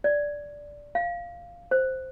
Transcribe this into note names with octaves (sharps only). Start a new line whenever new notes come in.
D5
F5
C5